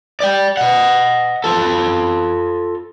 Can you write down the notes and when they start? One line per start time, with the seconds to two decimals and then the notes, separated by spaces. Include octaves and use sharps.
0.20 D5 G5
0.57 D#5 F#5
1.44 F4 A4